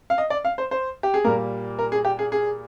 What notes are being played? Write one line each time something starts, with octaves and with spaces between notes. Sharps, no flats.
F5
D#5
D5
F5
C5
C5
G4
G#4
A#2 G3 A#3 A#4
A#4
G#4
G4
G#4
G#4